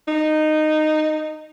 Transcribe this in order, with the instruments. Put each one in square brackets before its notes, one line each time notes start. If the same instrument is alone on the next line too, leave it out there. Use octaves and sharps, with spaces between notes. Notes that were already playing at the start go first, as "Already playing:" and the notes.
[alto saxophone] D#4